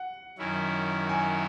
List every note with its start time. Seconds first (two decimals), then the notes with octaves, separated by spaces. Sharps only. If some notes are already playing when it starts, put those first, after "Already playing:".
Already playing: F#5
0.38 F#2 D#3 F#3 C#4 E4
1.09 G#5